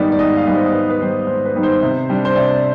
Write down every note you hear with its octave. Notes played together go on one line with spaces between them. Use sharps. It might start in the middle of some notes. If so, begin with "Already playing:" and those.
Already playing: G#2 D#3 G3 B3 D#4 D5
D5
G#2 D#5
F5
D#3 G3 B3 D#4 D5
C5
G#2 B4
B4
D#3 G3 B3 D#4 C5
G#2 C5
B4
D#3 G3 B3 D#4
C5
C3
G3 D4
C5
C3 D5